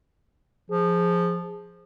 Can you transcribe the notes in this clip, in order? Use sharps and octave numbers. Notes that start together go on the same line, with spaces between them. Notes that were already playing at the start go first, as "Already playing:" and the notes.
F3 G#4